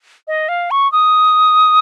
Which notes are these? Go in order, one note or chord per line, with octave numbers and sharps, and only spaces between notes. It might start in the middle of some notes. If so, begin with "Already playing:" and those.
D#5
F5
C#6
D#6